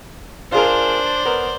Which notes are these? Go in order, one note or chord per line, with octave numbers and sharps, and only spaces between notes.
D4 F4 G#4 A#4 C5 D5
B3 A#4